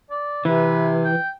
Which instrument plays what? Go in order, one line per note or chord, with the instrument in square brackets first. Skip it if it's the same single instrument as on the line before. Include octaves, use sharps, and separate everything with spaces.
[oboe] D5
[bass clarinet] C3 [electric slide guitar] E3 [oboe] B4
[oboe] G5